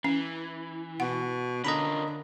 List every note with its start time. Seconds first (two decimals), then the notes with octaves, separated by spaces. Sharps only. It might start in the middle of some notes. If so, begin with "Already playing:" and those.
0.04 E3 C#4
1.00 B2 F#5
1.65 D3 C#4 F4 A#4 D#5 A#5 B5